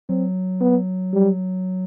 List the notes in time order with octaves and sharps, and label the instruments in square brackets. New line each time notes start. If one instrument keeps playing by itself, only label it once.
[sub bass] F#3 [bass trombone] C4
[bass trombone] B3
G3